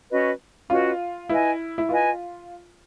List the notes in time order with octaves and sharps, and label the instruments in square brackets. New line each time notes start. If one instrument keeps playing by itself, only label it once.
[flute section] C#4 F#4 B4 D#5
[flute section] C#4 F#4 B4 D#5 [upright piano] F4
[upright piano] E4 [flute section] B4 D#5 G#5
[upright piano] E4
[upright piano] F4 [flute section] B4 D#5 G#5